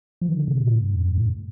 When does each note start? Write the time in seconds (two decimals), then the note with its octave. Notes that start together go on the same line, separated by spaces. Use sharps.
0.21 F3
0.29 D#3
0.37 D3
0.48 C3
0.60 A#2
0.72 A2
0.83 G2
0.96 F2
1.06 G2
1.18 A2